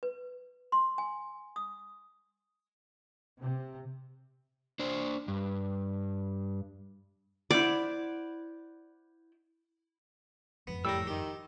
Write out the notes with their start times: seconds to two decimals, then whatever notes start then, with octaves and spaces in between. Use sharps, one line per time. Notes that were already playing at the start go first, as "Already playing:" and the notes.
0.03 B4
0.72 C6
0.98 G#5
1.56 D#6
3.42 C3
4.79 D4 C5
5.28 G2
7.51 E4 C5 D5 F#5
10.67 F#1 F2 G#2 B3
10.85 A2 G3 A#4 E6
11.07 D#3 G4